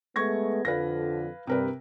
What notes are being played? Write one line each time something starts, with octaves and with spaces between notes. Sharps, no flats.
G#3 A3 B3 C#6 G#6 A#6
F2 D3 B4 F5 A#6
G2 C3 A#4 B4